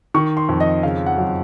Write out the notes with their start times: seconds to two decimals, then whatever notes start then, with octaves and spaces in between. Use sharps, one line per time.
0.14 D#3 C#6
0.37 C6
0.49 F2
0.60 D#5
0.83 C#3 F5
1.06 F#5
1.18 F#2